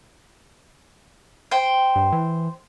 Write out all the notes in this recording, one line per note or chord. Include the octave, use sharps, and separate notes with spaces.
C5 G5
G2
E3